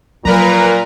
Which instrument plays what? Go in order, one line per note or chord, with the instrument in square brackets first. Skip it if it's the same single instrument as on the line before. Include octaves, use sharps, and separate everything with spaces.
[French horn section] A#2 [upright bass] F3 F#3 [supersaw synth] A#4 B4 A#5